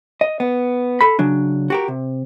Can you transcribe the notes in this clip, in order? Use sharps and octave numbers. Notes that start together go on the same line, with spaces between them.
D#5
B3
A4 B5
C#3 F#3 D4
F#4 G4 A#4
C3